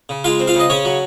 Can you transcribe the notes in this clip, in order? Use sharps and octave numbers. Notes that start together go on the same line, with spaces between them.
C#3
G#3 F4 F5
C4
F4 F5
C#3 D#5
C#3 C#4 C#5
F#3